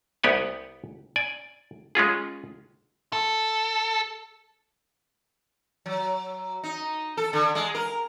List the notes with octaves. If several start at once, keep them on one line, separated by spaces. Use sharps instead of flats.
C2 B3 G4 F#5 G#5
D5 G#5
G#3 C#4 F4 G#4
A4
F#3
D#4
A4
D3
G#3
A#4